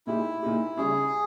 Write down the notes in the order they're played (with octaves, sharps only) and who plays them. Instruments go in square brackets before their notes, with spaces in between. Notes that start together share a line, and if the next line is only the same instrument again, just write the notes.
[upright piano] A#2 G#3 D#4 G4 [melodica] E4
[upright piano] A#2 G#3 D#4 G4
[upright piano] C#3 G3 C#4 [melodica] G#4